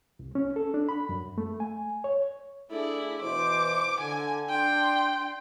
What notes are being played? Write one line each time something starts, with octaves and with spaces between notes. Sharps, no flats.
C2
C#4
A4
D4
B5
F#2
A3
G#5
C#5
A3 D4 E4 G#4 D5
B2 E3 C5 D6
D3 G#5
D4 G5 C6